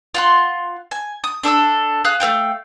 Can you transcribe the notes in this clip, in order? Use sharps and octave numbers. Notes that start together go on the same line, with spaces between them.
F4 F#5 C6
G#5
D#6
D4 A4 D6 E6
G#4 F5 F#6
A3 A#4 F5 G5